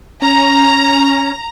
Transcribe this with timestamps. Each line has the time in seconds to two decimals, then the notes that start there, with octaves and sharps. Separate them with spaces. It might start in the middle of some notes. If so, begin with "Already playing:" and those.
0.22 C#4 A#5